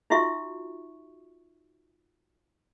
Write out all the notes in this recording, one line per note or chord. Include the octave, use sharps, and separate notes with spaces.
D#4 F4 F#4 E5 C#6